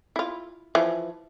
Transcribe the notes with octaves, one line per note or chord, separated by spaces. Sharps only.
E4 F4
E3 F3